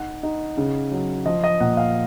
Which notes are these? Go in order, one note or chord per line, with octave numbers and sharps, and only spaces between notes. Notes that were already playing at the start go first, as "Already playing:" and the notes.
Already playing: D#4 F#5
D#4
C#3
F#3
F3 D#5
D#5
A#2 F#5
F5